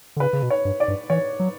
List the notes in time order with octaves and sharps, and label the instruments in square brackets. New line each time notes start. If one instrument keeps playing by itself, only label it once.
[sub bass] D3
[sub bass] C#3 [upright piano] B4
[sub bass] C#3
B2
[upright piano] C#5
[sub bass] G2
[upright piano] D5
[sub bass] G2
[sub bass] E3 [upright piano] C#5
[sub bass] F#3